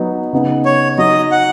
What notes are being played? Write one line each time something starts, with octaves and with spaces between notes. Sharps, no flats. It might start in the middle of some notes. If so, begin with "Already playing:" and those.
Already playing: F#3 B3 D#4
C#3 B3 D#4
C#5
F#3 D#4 D#5
F#5